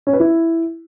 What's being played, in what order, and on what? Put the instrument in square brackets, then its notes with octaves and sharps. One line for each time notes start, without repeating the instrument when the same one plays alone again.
[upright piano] C#4
B4
E4